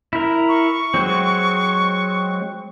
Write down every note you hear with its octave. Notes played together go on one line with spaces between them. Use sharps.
E4 A#4
C#6
F#3 G#3 C4